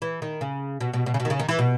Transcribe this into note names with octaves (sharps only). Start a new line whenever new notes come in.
E3
D#3
C#3
B2
B2
B2
C#3
B2
D#3
C#3
D#3
E3
B2